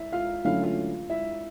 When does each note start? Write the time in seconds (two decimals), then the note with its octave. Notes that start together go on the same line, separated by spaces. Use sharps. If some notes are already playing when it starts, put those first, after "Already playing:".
Already playing: E4 E5
0.12 F4 F5
0.45 D3 F#3 A3 C#4 E4 F5
0.63 F4 F5
1.09 E4 E5